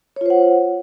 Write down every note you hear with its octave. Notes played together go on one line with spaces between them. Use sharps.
F4 C5 C#5 F#5